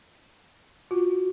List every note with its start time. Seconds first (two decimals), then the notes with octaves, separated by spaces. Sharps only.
0.91 F4 F#4